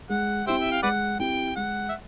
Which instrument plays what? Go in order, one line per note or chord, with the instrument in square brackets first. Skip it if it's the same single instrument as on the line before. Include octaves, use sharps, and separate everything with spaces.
[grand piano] G#3 [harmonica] F#5
[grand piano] C4 E4 G4 [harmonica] C5 E5 G5
[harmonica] E5
F5
[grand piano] G#3 [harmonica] B4 D5 F#5
[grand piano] C4 E4 G4 [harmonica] G5
[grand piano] G#3 [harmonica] F#5
[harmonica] E5